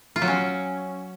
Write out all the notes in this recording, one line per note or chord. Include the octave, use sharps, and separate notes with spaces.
F4
F#3
C#4